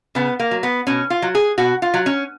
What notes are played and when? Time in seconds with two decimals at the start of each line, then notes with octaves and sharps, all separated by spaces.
0.15 C#3 B3
0.40 A#3
0.51 F#3
0.63 B3
0.87 B2 C#4
1.10 F4
1.22 F#3
1.35 G#4
1.58 B2 F#4
1.82 F4
1.94 F#3
2.06 C#4